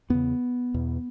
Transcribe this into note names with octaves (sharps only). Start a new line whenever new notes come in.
E2 C#3 B3
E2 B2